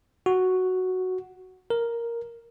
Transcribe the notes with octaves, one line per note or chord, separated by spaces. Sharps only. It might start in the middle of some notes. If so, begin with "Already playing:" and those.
F#4
A#4